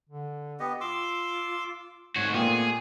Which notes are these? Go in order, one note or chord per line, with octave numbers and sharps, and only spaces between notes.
D3
B3 G4 D#5
F4 C6 D6 E6
G#2 A3 F#4 C#5
A#2 B3 C4 G#4